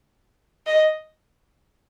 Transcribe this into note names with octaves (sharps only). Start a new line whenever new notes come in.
D#5